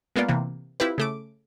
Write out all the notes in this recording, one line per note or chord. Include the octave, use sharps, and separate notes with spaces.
G#3 A#3 B3 F4 D5
C3 E3 A#3
C4 E4 F4 G4 B4
C#3 A3 D6